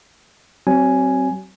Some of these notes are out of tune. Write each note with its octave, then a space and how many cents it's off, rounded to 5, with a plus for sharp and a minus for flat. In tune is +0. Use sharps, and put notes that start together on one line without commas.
F#3 +35 C4 +5 G#5 +5